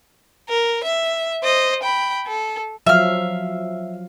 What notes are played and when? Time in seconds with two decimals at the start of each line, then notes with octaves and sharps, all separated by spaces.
0.49 A#4
0.84 E5
1.43 C5 D#5
1.83 G5 B5
2.27 A4
2.87 F3 F#3 E5 F5 F6